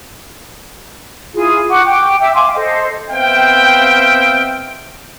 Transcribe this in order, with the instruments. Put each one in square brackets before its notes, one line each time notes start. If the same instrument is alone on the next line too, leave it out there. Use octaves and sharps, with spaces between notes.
[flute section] E4 F4 G#4
F#5 C#6 D6
G5 D6
E5 G5 D6 E6
F5 G#5 C6 D6
A4 C5 D#5
[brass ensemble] B3 C4 E5 F5 G5